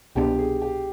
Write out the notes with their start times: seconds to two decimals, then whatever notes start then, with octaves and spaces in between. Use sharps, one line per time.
0.15 C2 B2 B3 D4 G4
0.38 G#4
0.62 G4